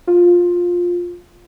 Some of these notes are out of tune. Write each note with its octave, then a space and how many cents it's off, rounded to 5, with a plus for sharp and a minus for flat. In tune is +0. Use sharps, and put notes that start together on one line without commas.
F4 +10